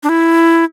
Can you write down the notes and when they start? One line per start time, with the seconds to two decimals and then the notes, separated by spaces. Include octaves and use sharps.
0.03 D4
0.09 E4